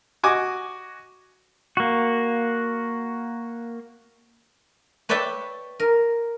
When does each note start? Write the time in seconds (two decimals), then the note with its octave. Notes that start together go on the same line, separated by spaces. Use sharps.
0.23 F#4 D#5 G#5 D6
1.77 A#3 F#4
5.09 B4 C#5 D5 E5 G5 A5
5.80 A#4